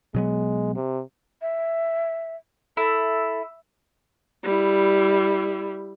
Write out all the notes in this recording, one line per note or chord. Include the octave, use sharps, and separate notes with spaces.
B2 F#3 G#3 B3
C3
E5
E4 A4
G3 E4